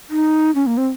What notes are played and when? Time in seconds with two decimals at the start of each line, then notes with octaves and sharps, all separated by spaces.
0.10 D#4
0.55 C#4
0.67 A#3
0.77 C4